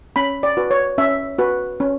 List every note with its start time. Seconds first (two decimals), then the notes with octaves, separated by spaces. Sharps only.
0.16 C#4 B5
0.43 D5
0.57 F#4 B4
0.71 C#5
0.98 C#4 E5
1.39 F#4 B4
1.80 C#4